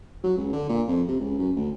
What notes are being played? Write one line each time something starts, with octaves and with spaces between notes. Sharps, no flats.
F#3
C#2
D3
A#2
F2
C3
C#2
F#2
D2